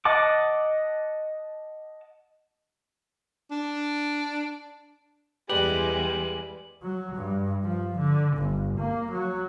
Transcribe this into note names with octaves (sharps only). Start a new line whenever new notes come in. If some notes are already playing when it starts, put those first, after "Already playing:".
D#5 F#5 A5 D6
D4
E2 G3 G#3 G4 B4 D5 F#7
F#3
G2
F3
D3
G1
A#3
F#3